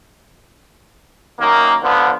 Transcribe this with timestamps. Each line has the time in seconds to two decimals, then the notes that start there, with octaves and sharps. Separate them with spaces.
1.40 F#2 D#3 A#3
1.82 D3 F3 B3